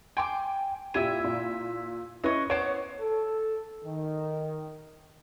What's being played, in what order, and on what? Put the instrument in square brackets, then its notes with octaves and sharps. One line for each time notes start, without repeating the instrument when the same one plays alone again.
[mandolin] G5 C6 D6 [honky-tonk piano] G#5
[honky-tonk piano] A#2 G4 D#7 [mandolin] E4 E5
[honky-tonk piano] A#2
[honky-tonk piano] C#4 E4 B4 [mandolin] C#5 D#5
[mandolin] B3 C5 D6 [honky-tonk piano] C#5
[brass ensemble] A4
D#3